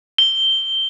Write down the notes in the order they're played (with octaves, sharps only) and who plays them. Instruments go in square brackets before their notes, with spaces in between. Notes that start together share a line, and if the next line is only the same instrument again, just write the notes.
[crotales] G7